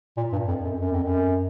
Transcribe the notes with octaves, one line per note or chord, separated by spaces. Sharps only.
A#2
G2
F2
F#2
F#2
F2
F#2